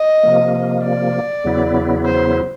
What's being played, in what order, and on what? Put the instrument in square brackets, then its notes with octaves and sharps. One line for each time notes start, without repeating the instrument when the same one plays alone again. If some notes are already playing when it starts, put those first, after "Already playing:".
Already playing: [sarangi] D#5
[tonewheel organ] C3 F3 A#3
[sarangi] D5
[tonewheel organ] E2 C#3 F#3 B3 E4
[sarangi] C5